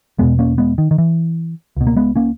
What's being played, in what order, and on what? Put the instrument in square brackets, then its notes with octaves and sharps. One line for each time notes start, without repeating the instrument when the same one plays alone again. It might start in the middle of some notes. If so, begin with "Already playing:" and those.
[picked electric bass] E1 E2 B2 G#3 B3
A#3 C#4
G#3 B3
D#3
D#3
E3
C#2 B2
A#3
G#3 B3
A#3 C#4